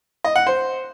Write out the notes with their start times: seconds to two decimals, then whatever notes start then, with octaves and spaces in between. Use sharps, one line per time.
0.24 D#5
0.36 F#5
0.47 C5